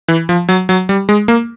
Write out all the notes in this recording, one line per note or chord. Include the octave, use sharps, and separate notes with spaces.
E3
F3
F#3
F#3
G3
G#3
A#3